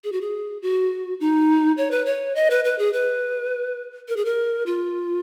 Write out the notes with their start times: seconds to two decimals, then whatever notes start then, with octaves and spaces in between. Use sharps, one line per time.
0.04 G#4
0.12 F#4
0.21 G#4
0.62 F#4
1.20 D#4
1.77 C#5
1.91 B4
2.06 C#5
2.35 D#5
2.50 B4
2.64 B4
2.79 G#4
2.93 B4
4.08 A#4
4.17 G#4
4.25 A#4
4.66 F4